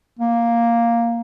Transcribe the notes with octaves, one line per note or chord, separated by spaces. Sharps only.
A#3